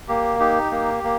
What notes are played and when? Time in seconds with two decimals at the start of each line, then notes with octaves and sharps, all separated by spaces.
0.08 A#3 G4
0.40 D#4 G4
0.71 A#3
1.04 A#3